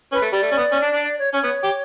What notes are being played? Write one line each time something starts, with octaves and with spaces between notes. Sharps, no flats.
C#4 B4
A3
G3 D5
A3
C#4
B3
C#4
D4
D4
D5
C#5
C#4 C#5
B3
G4